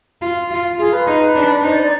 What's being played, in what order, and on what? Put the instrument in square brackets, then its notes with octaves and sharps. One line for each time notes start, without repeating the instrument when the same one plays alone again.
[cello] F4
F4
[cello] F4 [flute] G#4
[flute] B4
[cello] D#4
D4
[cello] D#4 [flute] C5
[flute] D5
D5